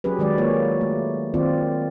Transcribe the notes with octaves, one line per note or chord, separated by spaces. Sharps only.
F#3 C#4 G4 G#4 B4
D#3 F#3 G#3 G4 D5
A#3 F4 C#5
A3
D#3 C4 F4 D5